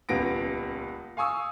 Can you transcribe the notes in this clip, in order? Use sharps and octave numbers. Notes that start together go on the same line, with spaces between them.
D#1 C#2 B3 A#6 D7
F5 G#5 C#6 D#6 E6